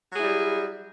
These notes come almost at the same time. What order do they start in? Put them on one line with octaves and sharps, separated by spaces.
F#3 G#4 E4 G3